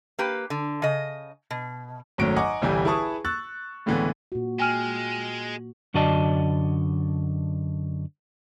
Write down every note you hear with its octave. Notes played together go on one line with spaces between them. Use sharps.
A#3 G4 B4
D3
C#3 D#5
B2
G#1 F#2 A2 F#3 D7
D#5 F#5 G#5 A#5 C#6 D6
G1 C2 E3 G3 G4 G#5
E4 G#4 B4 A5 C#6 D#6
C#6 E6 F#6 A6
C#2 A2 D3 E3 A3 B3
A#2 F#4
G#3 G5 G#5 F6
F#2 D3 F#4 D5 D#5 A5